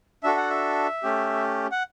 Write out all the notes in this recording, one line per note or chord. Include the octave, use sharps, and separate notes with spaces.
D4 F#4 A4 E5
F#5
E5
A3 C#4 G4
F#5